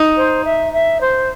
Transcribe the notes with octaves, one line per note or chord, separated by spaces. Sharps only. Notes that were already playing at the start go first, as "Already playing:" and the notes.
Already playing: D#4
C5
E5
E5
C5